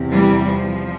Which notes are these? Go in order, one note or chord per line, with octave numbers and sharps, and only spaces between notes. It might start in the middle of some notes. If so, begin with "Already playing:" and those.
Already playing: E2 C3
E3 G3
F3